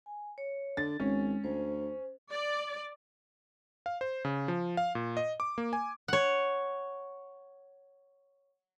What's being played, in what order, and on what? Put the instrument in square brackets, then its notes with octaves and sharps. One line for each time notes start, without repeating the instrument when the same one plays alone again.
[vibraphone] G#5
C#5
[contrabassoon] D3 [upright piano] A6
[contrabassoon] G#1 [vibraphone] G#3 [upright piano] C#4
[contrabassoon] D2 [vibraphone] C5
[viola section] D5
[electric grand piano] F5
C5
C#3
F3
F5
A#2
D#5
D6
A#3
G#5
[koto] C#5 F#5